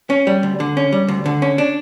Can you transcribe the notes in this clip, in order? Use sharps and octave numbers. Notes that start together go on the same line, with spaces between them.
C#4
G3
D2
D3
C#4
G3
D2
D3
C#4
D4